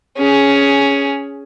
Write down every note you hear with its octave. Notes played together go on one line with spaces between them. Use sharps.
C#4 G#4